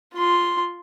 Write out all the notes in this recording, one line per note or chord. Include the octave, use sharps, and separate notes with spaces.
F4 C6